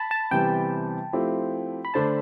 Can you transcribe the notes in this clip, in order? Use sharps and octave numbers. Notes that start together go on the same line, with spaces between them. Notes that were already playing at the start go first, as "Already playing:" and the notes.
Already playing: A5 B5
A5
C3 E3 G3 B3 G5
F3 A3 C4 E4 G4
B5
D3 A3 D4 A4 C5 A5